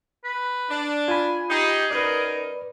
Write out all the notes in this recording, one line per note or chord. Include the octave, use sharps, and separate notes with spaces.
B4
D4
F4 G#5 B5
D#4 G4 G#4
F#2 D#4 A#4 B4 D5